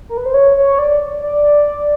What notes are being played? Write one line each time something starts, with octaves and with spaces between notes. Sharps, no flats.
A#4
B4
C5
C#5
C#5
D5
D5